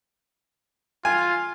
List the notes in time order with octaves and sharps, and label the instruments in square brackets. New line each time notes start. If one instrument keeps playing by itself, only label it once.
[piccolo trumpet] F4 [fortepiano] G#5